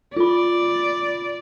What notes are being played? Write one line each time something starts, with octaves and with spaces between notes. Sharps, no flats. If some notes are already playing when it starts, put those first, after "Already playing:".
F4 D5 B5